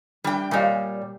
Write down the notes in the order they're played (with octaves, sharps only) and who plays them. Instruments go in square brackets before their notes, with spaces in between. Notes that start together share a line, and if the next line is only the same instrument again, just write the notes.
[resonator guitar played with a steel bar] G3 G5 [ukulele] D4
[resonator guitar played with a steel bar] A#2 G3 [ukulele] C#5 D#5 F5